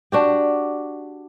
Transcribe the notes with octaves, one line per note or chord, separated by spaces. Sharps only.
D4 F#4 G4